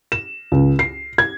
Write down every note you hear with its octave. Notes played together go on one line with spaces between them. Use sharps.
E7
C#2
C7
G#6